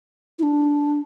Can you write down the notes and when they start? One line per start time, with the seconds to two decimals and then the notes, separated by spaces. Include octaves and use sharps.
0.39 E4
0.43 D4